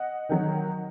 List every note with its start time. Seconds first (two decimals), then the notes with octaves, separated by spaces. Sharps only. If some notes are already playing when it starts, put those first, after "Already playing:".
Already playing: D#5 F#5
0.29 D#3 F#3